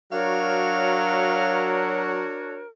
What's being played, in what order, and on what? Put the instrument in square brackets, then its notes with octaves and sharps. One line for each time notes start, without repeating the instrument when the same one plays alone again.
[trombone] F#3 [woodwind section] D4 F#4 C#5 [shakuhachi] A#4 [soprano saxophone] F5